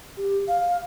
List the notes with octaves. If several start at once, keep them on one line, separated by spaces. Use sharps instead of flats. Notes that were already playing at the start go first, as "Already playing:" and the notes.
G4
F5